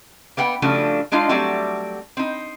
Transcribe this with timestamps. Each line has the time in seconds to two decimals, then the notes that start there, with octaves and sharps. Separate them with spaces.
0.37 A#3 B3 F#5 G5
0.62 C#3 F3 G3 A3 D4 F#4
1.12 G#3 D4 D#4 F4 F5
1.29 F#3 G3 A3 C4 F#4 D5
2.17 C4 D#4